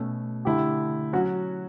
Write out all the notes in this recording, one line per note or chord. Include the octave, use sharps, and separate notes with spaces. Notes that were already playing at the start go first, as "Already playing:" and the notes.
Already playing: B2 A3 C#4
D3 A3 E4 G4
F#3 C#4 F#4